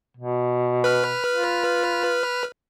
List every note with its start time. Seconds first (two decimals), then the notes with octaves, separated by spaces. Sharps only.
0.17 B2
0.84 B4 F6
1.31 F4